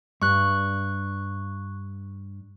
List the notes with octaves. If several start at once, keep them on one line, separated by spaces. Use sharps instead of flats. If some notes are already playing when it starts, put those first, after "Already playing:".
G2 C#6 F#6